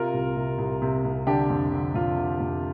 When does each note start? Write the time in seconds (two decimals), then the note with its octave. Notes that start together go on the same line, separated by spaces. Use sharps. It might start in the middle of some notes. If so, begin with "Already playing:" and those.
Already playing: C3 F4 A#4
0.14 C2
0.36 C3
0.58 C2
0.82 C3
1.04 C2
1.27 D3 D4 G4
1.50 F2
1.72 D3
1.95 F2 F4
2.17 D3
2.40 F2